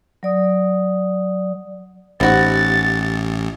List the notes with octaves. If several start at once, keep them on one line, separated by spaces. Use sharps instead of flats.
F#3 D5 D#6
A1 B2 D#4 F#4 G4 C5 A6